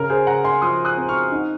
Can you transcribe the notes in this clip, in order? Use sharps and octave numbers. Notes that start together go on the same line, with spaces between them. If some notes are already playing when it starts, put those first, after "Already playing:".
Already playing: C#3 A#4
G#4 C5
C#3 F#5 A#5
G#5 C6
F3 C6 D#6
D#6 F#6
C4
C#6 F6
D#4